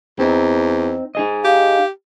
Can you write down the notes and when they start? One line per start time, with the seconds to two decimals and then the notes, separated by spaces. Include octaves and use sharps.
0.19 E2 C4 D#4
1.15 D#4 G#4 D#5
1.44 G4 F5